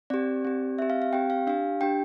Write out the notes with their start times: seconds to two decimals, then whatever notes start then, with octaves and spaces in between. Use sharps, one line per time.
0.10 C4 G4 D5
0.45 C4 G4
0.78 C4 G4 E5
0.90 F5
1.02 F5
1.13 C4 G4 G5
1.30 F5
1.47 D4 G4 F5
1.81 D4 G4 G5